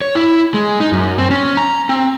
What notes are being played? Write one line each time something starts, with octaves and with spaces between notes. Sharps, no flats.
C#5
E4
G#3
D#4
F#2
C4
C#4
A#5
C4